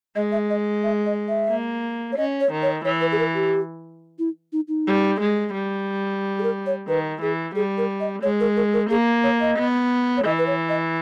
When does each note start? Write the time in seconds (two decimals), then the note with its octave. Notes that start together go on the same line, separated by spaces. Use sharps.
0.16 G#3 D#5
0.32 E5
0.50 D#5
0.84 E5
1.06 D#5
1.28 E5
1.50 A#3
2.12 C#5
2.17 C#4 D#5
2.41 C#5
2.52 D#3
2.62 C#5
2.85 E3 C#5
3.01 B4
3.12 G#4
3.19 A#4
3.35 G4
4.19 E4
4.53 D#4
4.68 D#4
4.87 G3
5.20 G#3
5.54 G3
6.39 G#4
6.43 A#4
6.66 C#5
6.88 D#3 B4
7.22 E3 G#4
7.55 G3 G#4
7.78 A#4
8.00 D#5
8.22 G#3 C#5
8.40 A#4
8.56 A#4
8.73 A#4
8.90 A#3 G#4
9.24 C#5
9.41 D#5
9.58 B3
10.17 C#5
10.25 E3 D#5
10.39 B4
10.47 C#5
10.69 D#5